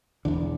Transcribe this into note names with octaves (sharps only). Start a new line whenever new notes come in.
E1 E2 D3